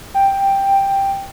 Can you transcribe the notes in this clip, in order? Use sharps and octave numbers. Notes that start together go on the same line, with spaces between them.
G5